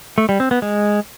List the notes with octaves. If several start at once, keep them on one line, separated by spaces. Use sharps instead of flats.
A3
G3
C4
B3
G#3